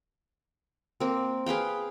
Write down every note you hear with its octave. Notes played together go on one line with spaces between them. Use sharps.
A#3 C4
G#4 B4 F5 G5